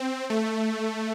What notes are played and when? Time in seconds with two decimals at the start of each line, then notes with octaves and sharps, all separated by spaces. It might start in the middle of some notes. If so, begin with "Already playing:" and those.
Already playing: C4
0.30 A3